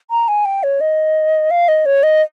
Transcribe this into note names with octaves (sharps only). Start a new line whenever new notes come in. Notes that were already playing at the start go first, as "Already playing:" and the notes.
A#5
G#5
G5
C#5
D#5
F5
D#5
C#5
D#5